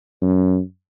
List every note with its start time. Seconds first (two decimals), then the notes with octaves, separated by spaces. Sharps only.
0.22 F#2